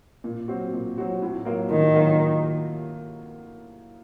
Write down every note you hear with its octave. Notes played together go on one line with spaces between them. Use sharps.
A#2
F#3 C4 F#4
A#2
F#3 C4 F#4
A2
F#3 A#3 F4 A#4
A2 D#3
F#3 A#3 F4 A#4